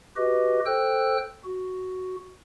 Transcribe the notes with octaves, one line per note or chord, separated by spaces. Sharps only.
F#4 G4 B4 D#5
A4 C5 G5 E6 F#6
F#4